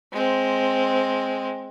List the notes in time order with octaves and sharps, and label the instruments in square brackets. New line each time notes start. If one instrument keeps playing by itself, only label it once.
[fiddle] G#3 C4